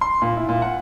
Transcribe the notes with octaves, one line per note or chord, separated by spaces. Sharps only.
C6
A#2
E4
A#2
F#5